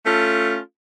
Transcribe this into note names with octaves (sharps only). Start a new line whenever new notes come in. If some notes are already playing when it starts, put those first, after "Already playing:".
A3 C#4 F4 A4